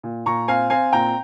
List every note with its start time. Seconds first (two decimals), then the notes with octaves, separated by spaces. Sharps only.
0.03 A#2
0.26 A#2 A#5 C#6
0.48 C4 F5 G#5
0.70 C4 F5 G#5
0.93 A#2 G5 A#5